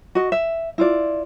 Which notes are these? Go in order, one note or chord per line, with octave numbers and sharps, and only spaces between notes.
F#4 D#5
E5
E4 F4 D5